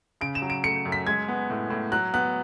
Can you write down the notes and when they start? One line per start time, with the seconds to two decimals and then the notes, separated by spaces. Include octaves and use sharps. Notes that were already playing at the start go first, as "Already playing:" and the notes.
0.21 C#3 D7
0.35 E7
0.42 F#3
0.50 D7
0.64 A3 C#7
0.85 F#2
0.92 B6
1.07 G#3 G#6
1.28 B3
1.50 A2
1.70 A2
1.92 F#3 F#6
2.14 B3 F#6